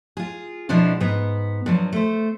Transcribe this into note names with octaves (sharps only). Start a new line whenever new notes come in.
F4 G#4
B2 F3 G#3 D4 E4
G#2 B3
G2 F3 F#3
A3 C5